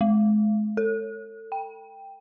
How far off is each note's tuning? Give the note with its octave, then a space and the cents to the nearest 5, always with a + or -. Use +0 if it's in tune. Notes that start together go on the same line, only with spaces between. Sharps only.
G#3 +35
A4 +30
G5 +5